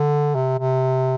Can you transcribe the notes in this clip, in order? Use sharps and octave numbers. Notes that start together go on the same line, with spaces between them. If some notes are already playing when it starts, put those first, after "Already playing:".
Already playing: D3
C3
C3